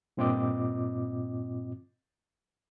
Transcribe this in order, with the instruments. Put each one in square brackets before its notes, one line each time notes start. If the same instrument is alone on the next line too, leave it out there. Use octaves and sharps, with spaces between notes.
[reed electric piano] G2 A#2 C4 F4 D#5 D6